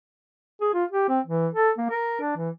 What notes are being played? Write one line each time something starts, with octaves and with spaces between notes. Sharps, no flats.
G#4
F4
G4
C4
E3
A4
A#3
A#4
D4
E3